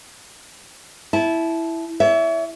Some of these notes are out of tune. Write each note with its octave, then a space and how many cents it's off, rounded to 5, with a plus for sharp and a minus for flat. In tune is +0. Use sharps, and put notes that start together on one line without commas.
E4 +0 A5 -20
C#5 +40 E5 +0